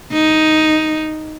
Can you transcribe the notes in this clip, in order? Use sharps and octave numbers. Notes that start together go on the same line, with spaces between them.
D#4